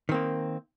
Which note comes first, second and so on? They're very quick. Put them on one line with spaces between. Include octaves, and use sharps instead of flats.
D#3 C4 A#3